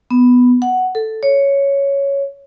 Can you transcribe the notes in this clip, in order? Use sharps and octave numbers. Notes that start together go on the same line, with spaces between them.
B3
F#5
A4
C#5